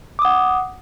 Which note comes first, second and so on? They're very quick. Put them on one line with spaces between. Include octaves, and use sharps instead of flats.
D6 D#6 F#5